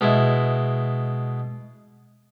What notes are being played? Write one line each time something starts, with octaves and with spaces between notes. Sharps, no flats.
B2 G#3 E4